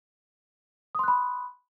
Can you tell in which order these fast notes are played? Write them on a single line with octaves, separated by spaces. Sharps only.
D#6 C6 F#6 B5